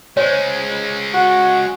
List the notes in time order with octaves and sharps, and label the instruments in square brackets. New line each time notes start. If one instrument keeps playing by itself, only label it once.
[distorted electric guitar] G#3 C#4 [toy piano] C5 C#5
[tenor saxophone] F#4